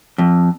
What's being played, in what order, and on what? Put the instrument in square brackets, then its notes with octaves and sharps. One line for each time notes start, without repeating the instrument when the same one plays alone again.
[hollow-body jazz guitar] F2